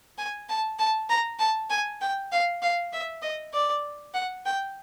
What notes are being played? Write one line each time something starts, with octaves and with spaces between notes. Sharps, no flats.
G#5
A5
A5
A#5
A5
G#5
G5
F5
F5
E5
D#5
D5
F#5
G5